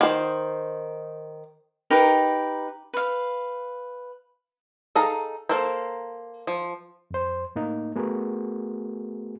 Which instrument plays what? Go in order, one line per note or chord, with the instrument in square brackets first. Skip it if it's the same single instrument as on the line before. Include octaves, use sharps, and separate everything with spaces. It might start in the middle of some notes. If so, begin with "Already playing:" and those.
[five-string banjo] D#3 C5
[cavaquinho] D#4 G4 A#4 B4
B4 F5
[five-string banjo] D#4 G#4 A4 F5 A#5
A#3 A4 A#4 C5
F3
[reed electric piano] F2 C5
A2 A#3 D#4
A3 B3 F#4 G#4 A#4